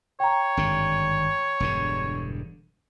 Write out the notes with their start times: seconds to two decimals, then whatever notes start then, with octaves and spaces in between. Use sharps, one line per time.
0.20 C#5 G5 A#5
0.57 G#1 G2 D3
1.60 E1 G2 D3